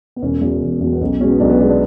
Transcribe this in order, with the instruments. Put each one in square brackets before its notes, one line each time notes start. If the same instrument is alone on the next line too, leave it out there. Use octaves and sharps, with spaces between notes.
[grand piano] B3
E1 C#4
E2 B2
E1
E2 B2
B3
B1 C#4
B2 G#3 C#4
B3
B1 D4
B3
B2 D4
G#3
D4